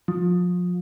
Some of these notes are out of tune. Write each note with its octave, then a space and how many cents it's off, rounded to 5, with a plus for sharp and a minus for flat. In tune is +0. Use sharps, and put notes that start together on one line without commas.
F3 +30